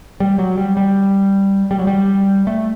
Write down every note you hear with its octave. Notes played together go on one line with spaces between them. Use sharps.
G3
F#3
G3
G3
G3
F#3
G3
A3